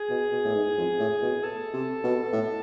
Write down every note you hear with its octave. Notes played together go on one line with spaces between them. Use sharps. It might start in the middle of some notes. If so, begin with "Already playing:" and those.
Already playing: G#4
B2
B2
A2
G#2
F2
A2
B2
A4
C3
B2
A2